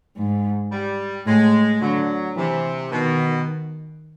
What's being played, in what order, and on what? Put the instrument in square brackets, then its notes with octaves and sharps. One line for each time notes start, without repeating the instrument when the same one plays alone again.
[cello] G#2
[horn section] G3
[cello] A2 [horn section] G#3
[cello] D3 [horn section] F#3
[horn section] C3 [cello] E3
[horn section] B2 [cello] D#3